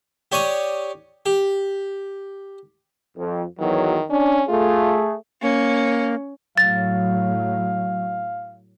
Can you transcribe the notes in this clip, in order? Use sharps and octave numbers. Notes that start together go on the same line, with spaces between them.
G4 C#5 D5 D#6
G4
F2
E2 D#3 F#3
C#4 D4
A3 F4 G#4
A#3 C#4
A2 F#3 F5 A6